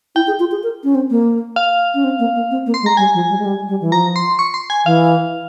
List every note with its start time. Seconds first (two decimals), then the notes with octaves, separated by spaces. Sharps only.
0.15 E4 G5
0.27 G#4
0.40 F4
0.51 G#4
0.63 A#4
0.84 C#4
0.95 C4
1.10 A#3
1.56 F5
1.94 C#4
2.04 C4
2.19 A#3
2.35 A#3
2.51 C4
2.66 A#3
2.74 C6
2.82 G#3
2.86 A#5
2.97 G3 G#5
3.14 F3
3.29 G3
3.38 G#3
3.45 G3
3.68 G3
3.81 E3
3.92 F3 A#5
4.16 C6
4.39 C#6
4.54 C6
4.70 G#5
4.85 E3 F5